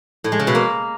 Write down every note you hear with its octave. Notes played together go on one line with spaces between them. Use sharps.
A2
G#3
C#3
B2
A#3